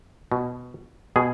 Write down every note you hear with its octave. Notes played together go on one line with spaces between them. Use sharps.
B2
B2 G#4